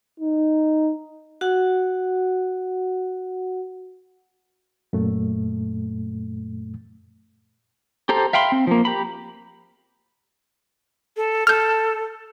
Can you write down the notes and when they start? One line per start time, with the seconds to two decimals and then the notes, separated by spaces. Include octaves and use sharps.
0.20 D#4
1.41 F#4 F#5
4.93 F#2 A#2 A3
8.09 G4 A4 C5 A#5
8.33 E5 F5 G5 B5 C6
8.52 C4
8.67 F3 A#3
8.85 G4 A#5 B5
11.17 A4
11.47 A4 F6 G6